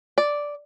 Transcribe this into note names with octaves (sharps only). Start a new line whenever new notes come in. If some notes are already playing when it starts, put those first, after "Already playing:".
D5